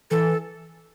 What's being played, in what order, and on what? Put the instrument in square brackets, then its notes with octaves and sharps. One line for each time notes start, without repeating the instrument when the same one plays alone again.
[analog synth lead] E3 [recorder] A4